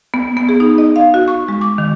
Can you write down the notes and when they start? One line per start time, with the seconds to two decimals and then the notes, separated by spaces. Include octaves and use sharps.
0.14 B3
0.37 B3
0.49 G#4
0.60 D#4
0.78 D#5
0.96 F5
1.14 F#4
1.28 C#6
1.48 G#3
1.61 D6
1.78 D#3